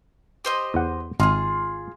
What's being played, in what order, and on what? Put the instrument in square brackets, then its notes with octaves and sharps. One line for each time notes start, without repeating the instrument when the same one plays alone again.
[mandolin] G4 C5 D#5
[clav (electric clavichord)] E2 F#5
[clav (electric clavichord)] G#1 [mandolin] F4 G#4